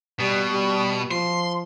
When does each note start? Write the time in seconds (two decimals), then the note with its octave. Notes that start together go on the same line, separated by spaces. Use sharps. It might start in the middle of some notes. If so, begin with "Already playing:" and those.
0.20 B2 G3
0.52 G3
1.11 F3 C6